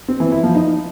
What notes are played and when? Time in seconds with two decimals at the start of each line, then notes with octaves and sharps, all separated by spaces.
0.08 C4
0.20 E3
0.32 E4
0.43 F3
0.55 D#4